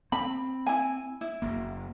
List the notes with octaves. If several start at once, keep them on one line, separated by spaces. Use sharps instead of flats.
C4 B5
E4 G#5
E4
F#1 A#3